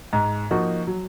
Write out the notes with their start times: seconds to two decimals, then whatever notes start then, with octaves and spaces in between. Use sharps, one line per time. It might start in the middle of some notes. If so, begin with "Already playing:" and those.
0.13 G#2
0.51 F3 A#3 D#4 F#4
0.87 F#3